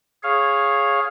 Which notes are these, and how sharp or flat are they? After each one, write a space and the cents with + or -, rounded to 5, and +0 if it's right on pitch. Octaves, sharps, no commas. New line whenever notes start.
G#4 +0 C#5 -10 F5 +0